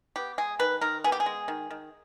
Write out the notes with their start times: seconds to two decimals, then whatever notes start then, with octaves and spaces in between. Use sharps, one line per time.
0.16 B3 G4
0.38 G#3 G#4
0.59 D#3 B4
0.81 D#3 A#4
1.04 B3 G#4
1.12 G4
1.20 G#4
1.26 G#3
1.48 D#3
1.70 D#3